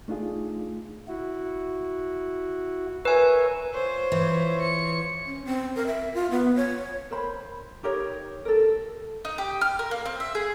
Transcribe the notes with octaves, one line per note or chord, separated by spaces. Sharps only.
A3 D4 D#4 F4 G#4
E4 F#4
A#4 B4 C#5 E5 G#5
F4 C5 C#5
E3
C#7
C#4
C4
A#4
E5
F4
B3
C#5
A#4 C5 B5
D#4 G4 A#4 C#5
A4 A#4
D#4
G4
F6
A#4
A#3
C4
E5
G#4